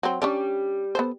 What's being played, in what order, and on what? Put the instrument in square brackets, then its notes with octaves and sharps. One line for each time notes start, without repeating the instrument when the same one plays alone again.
[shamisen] F#3 C4
[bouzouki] G3 [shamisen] C#4 D4 D5
[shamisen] B3 A4 C5